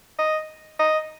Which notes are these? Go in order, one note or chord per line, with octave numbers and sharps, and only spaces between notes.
D#5
D#5